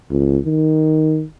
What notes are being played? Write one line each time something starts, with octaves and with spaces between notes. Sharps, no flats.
C#2
D#3